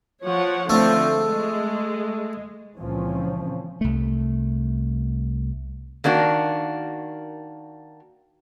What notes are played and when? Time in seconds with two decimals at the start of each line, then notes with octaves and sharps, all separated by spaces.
0.25 F3 C#5 F#5
0.70 D3 F3 A3 C4
1.20 G#3
2.79 C#2 A#2 E3 F3 C4 C#4
3.81 C2 A3
6.04 D#3 A#3 D4 F#4